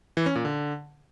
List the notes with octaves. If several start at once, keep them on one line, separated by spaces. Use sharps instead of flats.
E3
C#4
A#2
D3